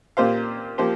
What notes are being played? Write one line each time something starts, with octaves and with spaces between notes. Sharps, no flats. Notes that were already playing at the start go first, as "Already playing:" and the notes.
A#2 A#3 G4 C5 F5
F3 A#3 G4 C5